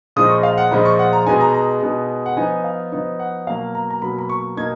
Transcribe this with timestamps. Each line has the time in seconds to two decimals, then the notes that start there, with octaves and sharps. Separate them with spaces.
0.16 A#2 F3 G#3 D#4 D#6
0.30 C#6
0.43 F5
0.58 F#5
0.71 A#2 F3 G#3 D#4 B5
0.85 C#6
0.99 F#5
1.13 A#5
1.26 B2 G#3 B3 D#4 G#5
1.41 A#5
1.54 A#5
1.81 B2 G#3 B3 D#4
2.26 F#5
2.37 F3 B3 D#4 G#5
2.64 F5
2.92 F3 B3 D#4
3.20 F#5
3.47 B2 F#3 A#3 F5
3.75 A#5
3.90 A#5
4.02 B2 F#3 A#3 B5
4.18 B5
4.30 C#6
4.57 B2 A#3 D#4 G#6